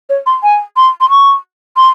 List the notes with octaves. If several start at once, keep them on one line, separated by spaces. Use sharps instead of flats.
C#5
C6
G#5
C6
C6
C#6
C6